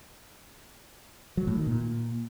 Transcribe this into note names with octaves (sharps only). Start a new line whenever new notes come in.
F#3
A2
D#3
A#2